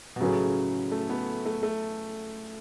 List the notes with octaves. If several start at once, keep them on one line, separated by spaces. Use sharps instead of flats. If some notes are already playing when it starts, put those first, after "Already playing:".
B2
A2 C#3 F#3 C#4 G#4 B4
A3
B3
A3
A3